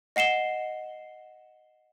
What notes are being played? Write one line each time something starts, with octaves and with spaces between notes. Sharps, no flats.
D#5 F#5 C7 E7 G7